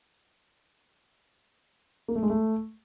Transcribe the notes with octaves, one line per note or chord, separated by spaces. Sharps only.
A#3
A3
G#3
A3